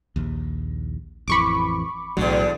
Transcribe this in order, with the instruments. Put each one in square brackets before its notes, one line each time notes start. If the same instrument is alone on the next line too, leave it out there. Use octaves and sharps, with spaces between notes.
[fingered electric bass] A#1 D#2
[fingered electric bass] A1 F2 E3 [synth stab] B5 C#6 D6
[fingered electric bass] B1 A2 F#3 [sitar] E2 D3